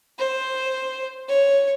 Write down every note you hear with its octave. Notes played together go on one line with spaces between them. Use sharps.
C5
C#5